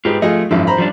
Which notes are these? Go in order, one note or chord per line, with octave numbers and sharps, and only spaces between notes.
G#2 F4 G4 B4
F3 A3 F4 G#4 D#5
G#1 F#2 F3 E4
C5 A#5 B5
F3 G3 D4